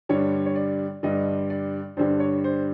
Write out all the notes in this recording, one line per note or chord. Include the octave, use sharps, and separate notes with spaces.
G2 D3 G3 C#5
C#5
D5
G2 D3 G3 D#5
D5
G2 D3 G3 C5
C#5
C5